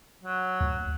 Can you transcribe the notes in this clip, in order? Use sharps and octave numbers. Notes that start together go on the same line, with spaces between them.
F#3
D2